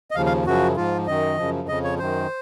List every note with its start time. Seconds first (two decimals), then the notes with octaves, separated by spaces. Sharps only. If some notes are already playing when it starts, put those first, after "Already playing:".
0.11 D#5
0.15 D#2 C#3 F3 F5
0.26 F5
0.46 F#2 C#3 F3 F#4
0.76 G#2 F3 F4
1.07 F#2 D#3 D#5
1.38 F#2 C#3 F3
1.68 F2 C#3 F3 D#5
1.84 C#5
1.99 F#2 D#3 C5